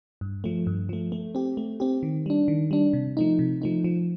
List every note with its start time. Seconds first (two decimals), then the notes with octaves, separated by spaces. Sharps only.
0.21 G2
0.44 F3 A3
0.67 G2
0.89 F3 A3
1.12 A3
1.35 C4 G4
1.57 A3
1.80 C4 G4
2.03 D#3
2.26 G3 D4
2.48 D#3
2.71 G3 D4
2.93 C3
3.17 F3 A3 D#4
3.39 C3
3.62 F3 A3 D#4
3.84 F3